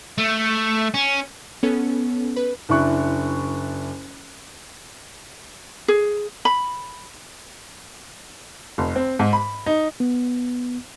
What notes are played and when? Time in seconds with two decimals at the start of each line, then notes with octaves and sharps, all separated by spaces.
0.18 A3
0.94 C#4
1.63 B3 C#4 A4
2.37 B4
2.69 F#1 D4 E4 C#6 F#6
5.88 G#4
6.45 B5
8.78 F1
8.96 C4
9.19 G#2
9.33 B5
9.66 D#4
10.00 B3